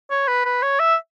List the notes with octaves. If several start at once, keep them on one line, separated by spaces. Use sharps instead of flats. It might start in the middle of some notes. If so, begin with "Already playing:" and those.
C#5
B4
B4
C#5
E5